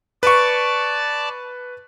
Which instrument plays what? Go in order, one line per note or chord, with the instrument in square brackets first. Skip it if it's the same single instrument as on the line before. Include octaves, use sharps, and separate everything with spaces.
[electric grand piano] B4 C#6 [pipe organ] D5 A5